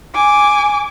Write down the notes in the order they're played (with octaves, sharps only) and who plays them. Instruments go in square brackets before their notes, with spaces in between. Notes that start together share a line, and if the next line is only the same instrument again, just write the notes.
[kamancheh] G#5 D6